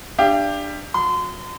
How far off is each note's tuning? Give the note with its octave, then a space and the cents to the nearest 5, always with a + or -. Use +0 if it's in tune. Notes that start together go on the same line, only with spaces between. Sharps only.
D4 +10 G4 +15 F5 -35
F#3 -40 C6 -30